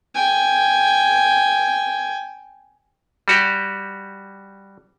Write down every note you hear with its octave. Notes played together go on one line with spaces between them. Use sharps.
G5 G#5
G3 F#4 G4